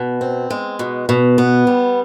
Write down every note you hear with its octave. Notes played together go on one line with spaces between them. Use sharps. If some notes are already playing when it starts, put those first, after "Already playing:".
Already playing: B2
C4
G#3
B2
B2
B3
G3